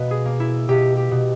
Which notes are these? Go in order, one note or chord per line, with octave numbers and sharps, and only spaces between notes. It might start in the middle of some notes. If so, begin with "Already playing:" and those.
Already playing: B2 A#3 B4
G#4
A#3
E4
B2 G4
G4
B2